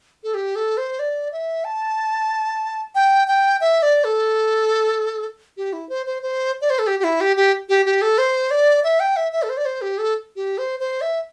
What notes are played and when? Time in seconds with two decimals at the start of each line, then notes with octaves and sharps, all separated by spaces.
0.24 A4
0.34 G4
0.56 A4
0.77 C5
0.99 D5
1.32 E5
1.64 A5
2.95 G5
3.28 G5
3.61 E5
3.82 D5
4.04 A4
5.57 G4
5.73 E4
5.89 C5
6.06 C5
6.22 C5
6.61 D5
6.70 C5
6.79 A4
6.87 G4
6.99 G4
7.04 E4
7.21 G4
7.36 G4
7.69 G4
7.86 G4
8.02 A4
8.18 C5
8.51 D5
8.84 E5
9.00 G5
9.16 E5
9.32 E5
9.43 A4
9.49 C5
9.57 D5
9.65 C5
9.81 G4
9.98 A4
10.36 G4
10.58 C5
10.80 C5
11.01 E5